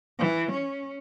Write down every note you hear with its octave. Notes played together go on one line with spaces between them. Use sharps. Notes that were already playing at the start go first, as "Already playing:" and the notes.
E3
C#4